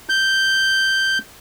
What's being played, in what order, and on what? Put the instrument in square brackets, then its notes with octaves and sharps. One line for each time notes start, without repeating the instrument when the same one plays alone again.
[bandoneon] G6